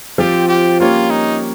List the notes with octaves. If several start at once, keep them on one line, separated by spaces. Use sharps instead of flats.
F3 C4 F4 G4 C5
G4
G3 A#3 C#4 F4 G4 C#5
D#4